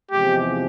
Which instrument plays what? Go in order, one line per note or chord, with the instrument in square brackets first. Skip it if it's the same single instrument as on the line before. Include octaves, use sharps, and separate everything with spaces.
[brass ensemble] E2 C3 F3 G#3 [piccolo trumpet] G4